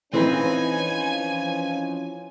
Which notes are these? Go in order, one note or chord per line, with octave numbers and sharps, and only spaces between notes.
E3 F3 C4 C#4 D#4 B4 G#5